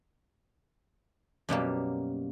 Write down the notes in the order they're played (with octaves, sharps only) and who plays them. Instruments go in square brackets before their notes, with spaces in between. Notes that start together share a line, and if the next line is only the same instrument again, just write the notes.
[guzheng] F#2 B2 G3 A#3